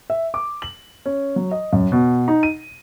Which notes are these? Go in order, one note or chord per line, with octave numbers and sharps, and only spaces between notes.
E5
D6
F#7
C#4
F#3
D#5
F#2
B2
D#4
D#7